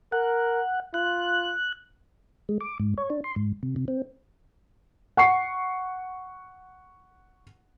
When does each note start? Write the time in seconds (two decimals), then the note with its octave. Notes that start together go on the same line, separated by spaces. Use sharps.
0.12 A#4 F#5
0.94 F4 F#6
2.49 G#3
2.61 D6
2.80 G#2
2.98 C#5
3.10 D4
3.24 C6
3.36 G#2
3.63 C3
3.76 C3
3.88 C4
5.17 F#5 C#6 C7